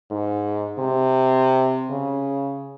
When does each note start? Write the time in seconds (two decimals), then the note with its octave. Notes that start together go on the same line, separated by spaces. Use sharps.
0.11 G#2
0.79 C3
1.90 C#3